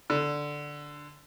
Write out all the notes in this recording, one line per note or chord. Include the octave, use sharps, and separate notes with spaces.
D3